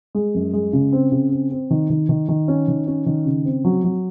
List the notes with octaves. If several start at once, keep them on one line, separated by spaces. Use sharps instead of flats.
G#3
F#2
G#3
C#3
C4
C#3
C4
C4
D#3
D#3
D#3
D#3
C#4
D#3
C#4
D#3
C#3
C4
F#3
F#3